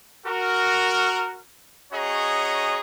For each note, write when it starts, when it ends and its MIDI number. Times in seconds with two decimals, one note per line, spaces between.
0.25 1.39 66
0.25 1.39 70
1.92 2.80 61
1.92 2.80 66
1.92 2.80 68
1.92 2.80 73
1.92 2.80 75
1.92 2.80 82